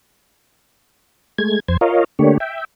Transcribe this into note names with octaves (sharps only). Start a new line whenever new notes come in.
G#3 A3 G#6
F2 C5 G#6
F4 A#4 C#5 D#5 F5
D3 A3 A#3 D4 G4 C#5
E5 G5